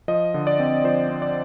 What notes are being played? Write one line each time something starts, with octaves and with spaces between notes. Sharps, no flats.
F3 D#5
D3
D5
C4
F3 C5
C4
D5